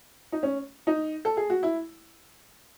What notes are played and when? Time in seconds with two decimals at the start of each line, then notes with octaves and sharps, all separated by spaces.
0.32 D#4
0.43 C#4
0.87 D#4
1.25 A4
1.37 G#4
1.50 F#4
1.63 E4